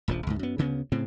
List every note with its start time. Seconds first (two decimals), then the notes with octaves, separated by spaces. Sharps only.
0.08 D#1 A#1 C3 F3
0.27 C#2 G#2
0.39 F#2 B3
0.58 D2 C#3 A#3 B3
0.92 A2 C#3 C4